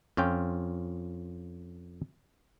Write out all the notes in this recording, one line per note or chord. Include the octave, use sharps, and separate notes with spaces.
F2 C#4 F4 G5